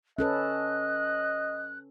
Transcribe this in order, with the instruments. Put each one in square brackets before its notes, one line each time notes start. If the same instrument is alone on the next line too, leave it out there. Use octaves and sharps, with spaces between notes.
[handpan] C#4 A4 B4 [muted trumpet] D#5 [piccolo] F#6